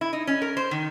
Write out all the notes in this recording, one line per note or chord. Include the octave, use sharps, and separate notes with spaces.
E4
D#4
C#4
A#4
C5
D#3